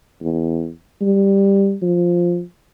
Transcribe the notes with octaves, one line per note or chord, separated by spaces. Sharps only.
E2
G3
F3